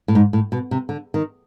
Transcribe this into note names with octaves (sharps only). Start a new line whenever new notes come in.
A2
G#2
A2
B2
C3
D3
D#3